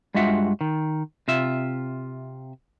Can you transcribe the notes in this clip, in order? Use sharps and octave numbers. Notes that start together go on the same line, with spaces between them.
G2 G#3 F4 F#4 E5 F#5
D#3
C3 F4 E5